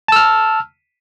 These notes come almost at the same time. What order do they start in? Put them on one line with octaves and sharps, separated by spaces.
A5 E6 F6